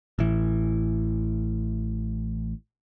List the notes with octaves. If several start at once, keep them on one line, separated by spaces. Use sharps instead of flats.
A1 E3